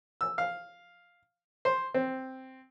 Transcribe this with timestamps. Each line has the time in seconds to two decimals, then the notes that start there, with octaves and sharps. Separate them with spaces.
0.21 E6
0.38 F5
1.65 C5
1.94 C4